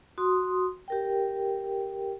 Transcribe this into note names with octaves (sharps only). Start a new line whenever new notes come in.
F#4 C6 D#6
G4 A#4 G5